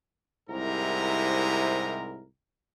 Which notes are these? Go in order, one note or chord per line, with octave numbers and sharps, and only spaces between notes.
C2 G#2 C3 E4 A#4 A#5